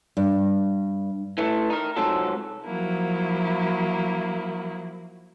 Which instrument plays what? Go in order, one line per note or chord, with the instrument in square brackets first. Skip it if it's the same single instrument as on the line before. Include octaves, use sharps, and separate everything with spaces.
[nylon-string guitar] G2
[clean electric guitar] E3 A3
D#4 A#4
G#2 C3 F3 F#3 A4
[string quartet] F3 F#3 A#3 E4